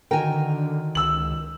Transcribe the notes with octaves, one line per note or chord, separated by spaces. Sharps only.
D3 D#3 F#4 A#4 G5 G#5
C#2 E6 F#7